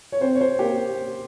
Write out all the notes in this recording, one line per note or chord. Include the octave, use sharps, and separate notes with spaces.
C#5
C4 C5
C#5
C5
A#3 G4